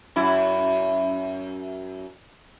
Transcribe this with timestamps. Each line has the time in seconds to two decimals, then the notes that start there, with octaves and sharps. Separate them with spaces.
0.16 F#2 E4